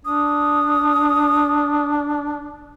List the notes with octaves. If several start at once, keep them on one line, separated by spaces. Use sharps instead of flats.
D4 D#6